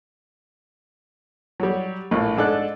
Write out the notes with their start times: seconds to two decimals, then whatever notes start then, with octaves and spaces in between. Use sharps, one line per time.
1.60 F#3 G3
2.11 A#1 A2
2.37 G#2 D4 A4 F#6